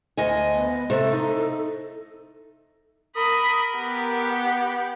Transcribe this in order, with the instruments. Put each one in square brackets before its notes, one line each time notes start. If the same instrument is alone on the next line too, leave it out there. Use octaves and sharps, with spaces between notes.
[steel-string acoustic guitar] D2 D#5 G#5
[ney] B3
[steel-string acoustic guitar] C3 A3 [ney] A4
[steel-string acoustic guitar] D#4
[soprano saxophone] A#4 [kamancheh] B5 D#6
[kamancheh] B3 G4